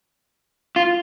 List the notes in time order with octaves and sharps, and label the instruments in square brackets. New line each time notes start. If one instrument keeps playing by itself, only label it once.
[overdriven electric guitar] F4